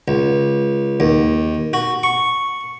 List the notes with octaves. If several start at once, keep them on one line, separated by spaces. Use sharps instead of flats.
C#2
D#2
F#4
C#6